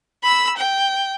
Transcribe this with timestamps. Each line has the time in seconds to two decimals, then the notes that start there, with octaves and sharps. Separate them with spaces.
0.23 B5 E6
0.57 G5